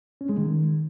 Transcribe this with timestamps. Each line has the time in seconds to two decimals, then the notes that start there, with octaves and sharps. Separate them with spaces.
0.21 C#4
0.29 G#3
0.38 D#3